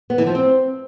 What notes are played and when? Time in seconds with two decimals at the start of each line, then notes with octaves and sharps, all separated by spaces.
0.10 B3
0.18 E3
0.27 F3
0.35 C4